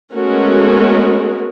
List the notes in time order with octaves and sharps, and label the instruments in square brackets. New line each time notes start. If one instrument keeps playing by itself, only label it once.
[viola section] G#3 A3 B3 C#4 F#4 A#4